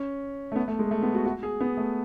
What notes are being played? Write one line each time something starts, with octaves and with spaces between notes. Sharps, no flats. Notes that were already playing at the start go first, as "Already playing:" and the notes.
Already playing: C#4
A3
B3
A3
G#3
A3
B3
F#4
F#4
G#4
B3
A3